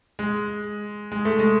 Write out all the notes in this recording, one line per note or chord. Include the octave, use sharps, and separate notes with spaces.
G#3
G#3
A3
G#3